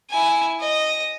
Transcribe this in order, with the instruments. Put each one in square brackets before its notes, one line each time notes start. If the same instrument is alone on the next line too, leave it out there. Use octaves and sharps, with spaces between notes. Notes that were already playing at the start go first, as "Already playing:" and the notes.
[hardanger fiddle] E4 G#5
D#5